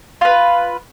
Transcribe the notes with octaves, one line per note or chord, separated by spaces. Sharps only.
F4 B4